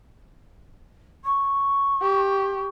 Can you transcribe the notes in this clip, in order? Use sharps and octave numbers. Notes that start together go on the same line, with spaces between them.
C#6
G4